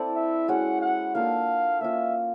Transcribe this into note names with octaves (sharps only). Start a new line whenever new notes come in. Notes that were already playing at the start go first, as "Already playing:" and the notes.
Already playing: C4 E4 A4 D5
E5
G#3 C#4 F#4 F#5
F#5
A#3 D4 F4 A4 F5
A#3 C#4 F4 E5